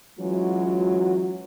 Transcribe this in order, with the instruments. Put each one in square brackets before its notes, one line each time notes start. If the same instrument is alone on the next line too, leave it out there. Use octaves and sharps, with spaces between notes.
[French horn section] E3 F#3 G#3 C#4 F4 F#4